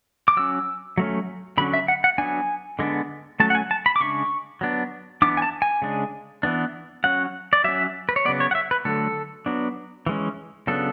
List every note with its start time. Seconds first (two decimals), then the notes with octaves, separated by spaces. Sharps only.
0.28 D6
0.37 F#3 C#4 E6
0.98 F#3 A3 C#4
1.58 D3 F#3 C#4 B5
1.74 E5
1.88 F#5
2.04 F#5
2.18 F#3 B3 D4 G#5
2.79 D3 G#3 B3 D4
3.40 F#3 A3 C#4 A5
3.50 F#5
3.55 G#5
3.71 A5
3.86 B5
3.96 D6
4.00 C#3 G#3 D4 C#6
4.61 F#3 B3 D4
5.22 E3 B3 D4 D6
5.37 G#5
5.42 A5
5.62 G#5
5.82 C#3 G#3 D4
6.43 E3 B3 D4
7.04 F#3 C#4 F#5
7.53 D5
7.64 F#3 C#4 E5
8.09 B4
8.16 C#5
8.25 C#3 F#3 B3 D5
8.40 C#5
8.51 F#5
8.55 E5
8.71 B4
8.85 D3 F#3 A3 A4
9.46 F#3 B3 D4
10.06 E3 G#3 C#4
10.67 C#3 F#3 B3 D4 A4